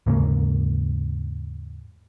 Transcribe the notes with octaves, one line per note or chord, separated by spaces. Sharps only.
D#2 G#2 C#3 A#3